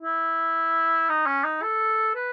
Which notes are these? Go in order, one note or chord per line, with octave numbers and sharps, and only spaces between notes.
E4
D#4
C#4
D#4
A4
B4